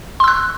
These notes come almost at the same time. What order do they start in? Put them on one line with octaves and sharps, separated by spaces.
C6 E6 F#6